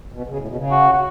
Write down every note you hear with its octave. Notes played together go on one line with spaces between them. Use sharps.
B2
C#3
A2
B2
C#3
F#4
F#4